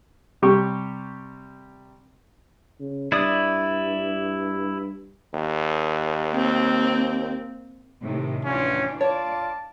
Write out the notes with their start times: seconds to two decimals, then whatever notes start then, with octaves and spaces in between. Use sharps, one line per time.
0.42 C3 G3 G4 C#6
2.80 C#3
3.12 G2 E4 D5 D#6
5.34 D#2
6.34 A#3 C4
8.03 A2 C3 D#3
8.45 D2 A2 E3 C#4 D4 F4
9.01 F4 C#5 D5 A5